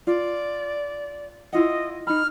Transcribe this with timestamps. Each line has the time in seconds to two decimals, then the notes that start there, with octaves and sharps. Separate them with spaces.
0.07 F4 D5
1.53 E4 F4 D#5 F#5
2.07 D#4 B5 F6